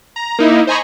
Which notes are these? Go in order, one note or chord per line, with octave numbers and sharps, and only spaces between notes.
A#5
A#3 D#4 E4
C5 D#5 G#5 A#5 B5 C#6